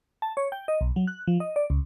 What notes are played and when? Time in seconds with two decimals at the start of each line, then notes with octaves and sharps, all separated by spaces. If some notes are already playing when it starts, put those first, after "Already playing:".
0.22 A5
0.37 C#5
0.52 G5
0.68 D#5
0.81 B1
0.96 F#3
1.07 F#6
1.27 F3
1.40 D#5
1.56 D5
1.70 C#2